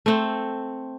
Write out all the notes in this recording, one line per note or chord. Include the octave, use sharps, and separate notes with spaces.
A3 C4